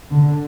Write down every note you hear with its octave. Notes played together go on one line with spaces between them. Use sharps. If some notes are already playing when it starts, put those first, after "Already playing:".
D3